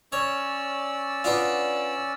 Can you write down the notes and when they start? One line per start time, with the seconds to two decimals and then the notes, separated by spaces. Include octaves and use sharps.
0.12 C#4 C#5 D5 E6
1.24 B3 D4 F4